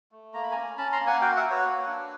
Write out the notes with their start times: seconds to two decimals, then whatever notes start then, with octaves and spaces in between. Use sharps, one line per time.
0.12 A3
0.34 A#3 A#5
0.43 B5
0.51 C#4 G#5 A#5
0.77 C#4 A5 B5
0.92 A#5 C6
1.00 A#3
1.06 F#5 G#5
1.21 F#4 F5 G5
1.36 E5 F#5
1.43 F#4
1.50 B4 C#5
1.66 A#3
1.87 D4